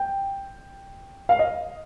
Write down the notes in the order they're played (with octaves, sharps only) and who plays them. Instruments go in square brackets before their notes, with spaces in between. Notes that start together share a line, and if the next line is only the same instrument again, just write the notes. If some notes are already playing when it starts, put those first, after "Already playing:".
Already playing: [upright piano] G5
F5
D#5